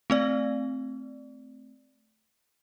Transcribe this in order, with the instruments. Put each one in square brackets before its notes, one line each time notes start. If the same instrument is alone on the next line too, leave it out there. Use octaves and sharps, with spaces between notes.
[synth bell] A3 C4 D5